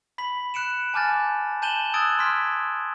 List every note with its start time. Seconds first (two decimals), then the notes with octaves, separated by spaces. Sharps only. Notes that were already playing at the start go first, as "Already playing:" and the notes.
0.18 B5 B6 F#7
0.54 F#6 C#7 D7 E7
0.94 G#5 A5 D6 F6 G6 A6
1.62 A5 G6 D#7 E7 F#7 G7
1.94 D#6 E6 F#6 G#6 A6 D7
2.19 C6 F6 G#6 B6